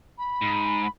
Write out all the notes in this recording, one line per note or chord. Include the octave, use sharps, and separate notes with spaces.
B5
G#2